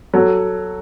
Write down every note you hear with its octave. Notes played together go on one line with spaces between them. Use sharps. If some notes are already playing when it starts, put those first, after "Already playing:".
F#3 A4